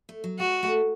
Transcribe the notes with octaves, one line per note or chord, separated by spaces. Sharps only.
A3
F#3
G#3 F#4
A3